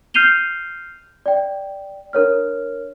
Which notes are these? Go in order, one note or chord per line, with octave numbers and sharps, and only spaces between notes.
F6 G6 C7 D#7 F7 G7
D5 G5
D4 A#4 C#5 F6